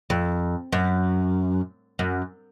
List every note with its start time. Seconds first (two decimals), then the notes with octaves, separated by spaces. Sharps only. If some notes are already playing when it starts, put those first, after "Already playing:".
0.10 F2
0.72 F#2
1.99 F#2